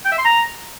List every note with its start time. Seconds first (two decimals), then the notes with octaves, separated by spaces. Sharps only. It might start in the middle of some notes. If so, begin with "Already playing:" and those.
0.05 G5
0.12 E5
0.18 C6
0.25 A#5